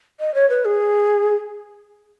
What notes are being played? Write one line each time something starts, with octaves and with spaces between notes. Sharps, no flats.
D#5
C#5
B4
G#4